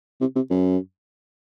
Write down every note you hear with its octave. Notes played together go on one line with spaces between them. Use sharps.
C3
C3
F#2